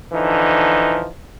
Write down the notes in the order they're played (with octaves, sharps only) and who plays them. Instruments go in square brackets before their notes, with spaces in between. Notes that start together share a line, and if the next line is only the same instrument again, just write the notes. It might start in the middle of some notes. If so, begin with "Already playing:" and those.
[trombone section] D3 E3 F3 D#4